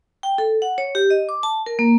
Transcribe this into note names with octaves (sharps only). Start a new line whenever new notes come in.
G5
A4
F#5
C#5
G4
D#5
D6
A5
A#4
A#3